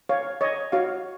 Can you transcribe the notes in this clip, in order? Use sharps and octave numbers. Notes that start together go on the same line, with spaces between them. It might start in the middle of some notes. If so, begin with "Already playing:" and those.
C#5 F5
C#5 D#5
F#4 C#5 F5